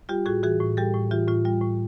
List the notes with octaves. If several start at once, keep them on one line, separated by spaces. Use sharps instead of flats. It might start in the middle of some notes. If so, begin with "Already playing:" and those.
G3 F4 G4
A2 F#4 G#4
E3 F#4 G#4
A2
G3 G4 A4
A2
E3 F4 G4
A2 F4
G3 F4
A2